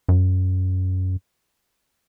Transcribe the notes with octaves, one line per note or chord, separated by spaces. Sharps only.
F#2